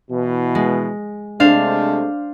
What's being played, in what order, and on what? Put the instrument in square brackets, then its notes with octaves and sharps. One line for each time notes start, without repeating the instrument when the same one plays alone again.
[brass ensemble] B2 E3
[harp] G#3
[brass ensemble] C3 G#3 A3 [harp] D4 C5 F5